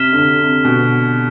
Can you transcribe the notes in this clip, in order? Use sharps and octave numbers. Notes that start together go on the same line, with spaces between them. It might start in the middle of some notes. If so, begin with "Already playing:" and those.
Already playing: C3 F6 B6 E7 G7
D3
C3
C3
B2